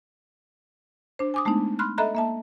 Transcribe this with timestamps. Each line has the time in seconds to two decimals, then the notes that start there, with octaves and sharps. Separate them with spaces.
1.19 D4 C5
1.34 G#5 D6 D#6
1.45 G#3 A3 B3 D4 D#4
1.79 B5 C6 F6 F#6
1.98 A4 D#5 E5 A#5 B5 F#6
2.15 A#3 E5 A5